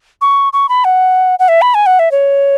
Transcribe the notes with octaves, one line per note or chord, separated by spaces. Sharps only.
C#6
C#6
B5
F#5
F#5
E5
B5
G#5
F#5
E5
C#5